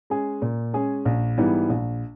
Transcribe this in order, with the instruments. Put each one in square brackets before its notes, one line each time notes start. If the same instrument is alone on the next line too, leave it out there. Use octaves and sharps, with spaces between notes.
[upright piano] G#3 C#4 G#4
A#2
G#3 C#4 G#4
A#1
G#2 E3 G3 B3
A#1